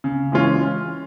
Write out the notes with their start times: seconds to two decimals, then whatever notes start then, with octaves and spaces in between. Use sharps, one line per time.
0.04 C#3
0.32 E3 G#3 C#4 F4